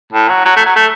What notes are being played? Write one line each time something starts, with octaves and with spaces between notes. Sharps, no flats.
A2
F#3
F#3
A3
F#3
A3